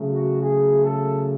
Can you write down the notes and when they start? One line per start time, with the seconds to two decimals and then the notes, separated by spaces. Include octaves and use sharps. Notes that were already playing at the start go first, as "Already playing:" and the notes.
Already playing: C#3 F#3 A3
0.11 F#4
0.40 G#4
0.83 A4